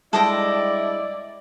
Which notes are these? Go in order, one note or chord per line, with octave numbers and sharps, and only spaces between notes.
G2 G#3 E4 A4 D5 D#5 G5